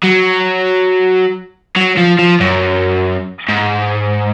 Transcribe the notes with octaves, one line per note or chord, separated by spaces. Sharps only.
F#3
F#3
F3
F3
F#2
G#2